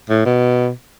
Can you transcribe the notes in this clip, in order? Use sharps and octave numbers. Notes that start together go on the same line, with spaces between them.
A2
B2